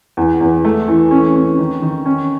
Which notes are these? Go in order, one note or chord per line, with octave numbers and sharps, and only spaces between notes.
E2
E2
A3
E3
C#4
C#4
D#3
D#3
C#4